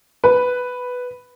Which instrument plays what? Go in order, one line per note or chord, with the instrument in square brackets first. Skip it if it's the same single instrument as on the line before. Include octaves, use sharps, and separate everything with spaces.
[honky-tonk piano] B4